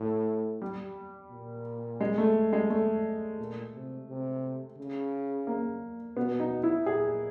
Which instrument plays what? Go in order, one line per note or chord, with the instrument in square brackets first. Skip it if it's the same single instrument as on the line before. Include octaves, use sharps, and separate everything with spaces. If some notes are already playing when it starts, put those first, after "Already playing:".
Already playing: [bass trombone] A2
[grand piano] G3
[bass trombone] A#2
[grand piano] G#3
A3
G#3
A3
[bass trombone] A#2
C3
C3
C#3
[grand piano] A#3
[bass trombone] B2 [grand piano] B3
[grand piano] D#4
E4
[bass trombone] A#2 [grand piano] G#4